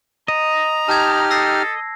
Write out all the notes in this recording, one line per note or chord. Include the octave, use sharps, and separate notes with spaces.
D#5 A#5
D#4 G4 A5 F6 G#6
A4 E6 A#6 C7